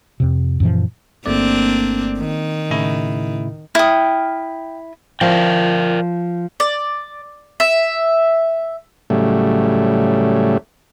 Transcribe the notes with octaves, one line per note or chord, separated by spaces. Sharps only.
F2 C3
F#2 A#2 E3 F3
G1 A3 A#3 C4 D4 D5
D#3
A2 C#3 E4
E4 G5 D#6 F6
F3 A#4 D5 G5
D5
E5
A2 C#3 F#3 G3 A3